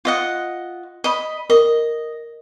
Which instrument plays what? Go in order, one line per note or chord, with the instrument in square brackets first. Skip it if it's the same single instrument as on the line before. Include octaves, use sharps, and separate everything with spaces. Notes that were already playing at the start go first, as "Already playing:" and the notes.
[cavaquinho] F4 D#5 F#5
D#5 B5
[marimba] A#4 [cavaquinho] D#5